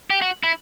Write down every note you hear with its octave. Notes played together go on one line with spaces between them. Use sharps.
G4
F#4
E4